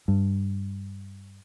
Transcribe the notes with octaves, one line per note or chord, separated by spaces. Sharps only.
G2